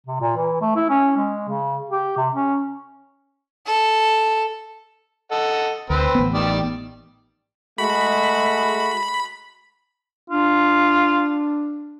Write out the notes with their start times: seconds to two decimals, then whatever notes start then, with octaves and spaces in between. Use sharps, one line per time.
0.07 C3
0.21 A#2
0.37 E3
0.61 A3
0.76 E4
0.90 C#4
1.17 G#3
1.48 C#3
1.90 G4
2.17 C3
2.33 C#4
3.66 A4
5.31 A4 D#5 F#5
5.90 D2 C4 B4
6.15 A1 B3
6.34 D#3 G3 D5
7.78 G#3 A3 F#4 B5
10.30 D4 F4